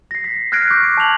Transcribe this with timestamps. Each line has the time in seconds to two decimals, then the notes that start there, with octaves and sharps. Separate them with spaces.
0.11 A#6 C7
0.24 B6
0.52 F6 F#6 G#6 A#6 C7 D7
0.70 C#6 D6 G6
0.84 D7
0.97 A5 G#6 F7 F#7